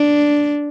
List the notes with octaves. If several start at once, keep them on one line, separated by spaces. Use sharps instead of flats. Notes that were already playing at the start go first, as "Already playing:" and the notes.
Already playing: D4